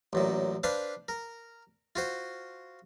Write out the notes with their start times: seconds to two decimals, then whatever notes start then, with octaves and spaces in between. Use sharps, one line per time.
0.13 A1 F#2 A#2
0.63 D4 B4 C5 F5
1.08 A#4
1.96 F4 F#4 C5